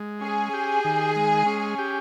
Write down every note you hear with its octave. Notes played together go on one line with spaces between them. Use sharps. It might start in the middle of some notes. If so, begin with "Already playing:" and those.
Already playing: G#3
C#4 G#4
G4
D#3
G#3
C#4
G4